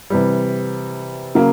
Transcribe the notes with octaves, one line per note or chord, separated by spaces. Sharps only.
C3 E3 G3
C#3 F#3 A#3